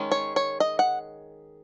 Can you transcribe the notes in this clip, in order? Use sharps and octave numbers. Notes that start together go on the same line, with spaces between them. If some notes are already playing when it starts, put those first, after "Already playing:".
Already playing: D#3 G#3 C#4
C#5
C#5
D#5
F#5